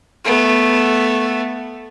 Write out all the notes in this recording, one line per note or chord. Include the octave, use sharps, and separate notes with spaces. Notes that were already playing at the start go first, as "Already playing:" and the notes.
A3 B3